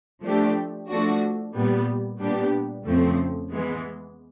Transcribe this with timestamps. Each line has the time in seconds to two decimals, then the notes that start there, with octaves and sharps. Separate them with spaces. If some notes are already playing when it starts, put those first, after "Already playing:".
0.23 F3 A3 D4 G4
0.89 F3 A3 D4 F#4
1.54 A#2 G3 B3
2.20 A#2 G3 B3 D4 G4
2.86 F2 C#3 F3 A3 C4
3.51 E3 G#3 B3